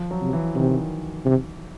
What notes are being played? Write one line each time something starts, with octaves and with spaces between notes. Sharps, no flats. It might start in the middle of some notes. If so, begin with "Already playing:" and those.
Already playing: F3
F#3
C3
E3
C3 D#3
C3